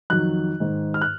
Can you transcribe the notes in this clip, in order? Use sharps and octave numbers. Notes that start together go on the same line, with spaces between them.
F2 D#3 F#3 F#6
G#2 D#3 G#3
F6
F#6